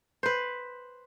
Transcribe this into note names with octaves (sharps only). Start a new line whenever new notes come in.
B4 C5